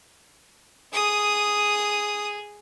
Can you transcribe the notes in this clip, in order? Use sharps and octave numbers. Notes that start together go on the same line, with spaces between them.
G#4 D#6